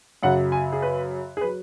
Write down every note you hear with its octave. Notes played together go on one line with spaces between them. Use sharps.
F#2 C#3 F#3 F#5
G#5
G#4
B4
G#4
F#3 B4